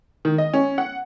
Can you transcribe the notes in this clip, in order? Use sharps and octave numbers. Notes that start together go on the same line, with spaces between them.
D#3
D#5
C#4
F#5